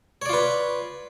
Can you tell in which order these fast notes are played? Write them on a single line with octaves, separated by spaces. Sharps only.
C#5 D5 F4 B4